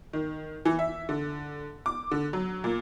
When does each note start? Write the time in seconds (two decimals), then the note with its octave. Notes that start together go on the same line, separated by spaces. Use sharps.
0.13 D#3
0.65 E3
0.79 E5
1.09 D3
1.86 D6
2.11 D3
2.33 F#3
2.64 A#2